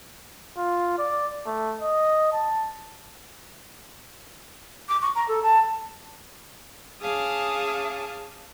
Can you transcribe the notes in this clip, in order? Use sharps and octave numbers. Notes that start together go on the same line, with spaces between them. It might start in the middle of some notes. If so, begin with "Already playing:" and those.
F4
D5
A3
D#5
A5
D6
C#6
A#5
A4
A5
C#4 G#4 F5 A5 D6 D#6